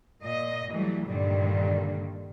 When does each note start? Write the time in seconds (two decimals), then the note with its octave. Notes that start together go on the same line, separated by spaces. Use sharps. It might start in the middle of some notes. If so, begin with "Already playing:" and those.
0.20 A#2 D#5
0.72 E3 F#3 G3 A3
1.07 G2 A#2 D3 D#3 G3